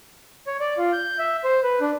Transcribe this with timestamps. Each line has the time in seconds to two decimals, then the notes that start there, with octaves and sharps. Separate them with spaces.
0.47 C#5
0.60 D5
0.78 F4
0.93 G6
1.19 E5
1.44 C5
1.63 B4
1.81 D4